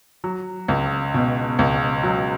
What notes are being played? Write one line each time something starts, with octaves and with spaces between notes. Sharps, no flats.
F#3
C#2
B2
C#2
F#3